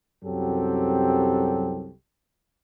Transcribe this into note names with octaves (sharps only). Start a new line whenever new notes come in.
C2 F#2 F#3 C4 G4 A4